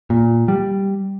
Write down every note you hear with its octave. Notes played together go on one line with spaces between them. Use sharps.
A#2
G3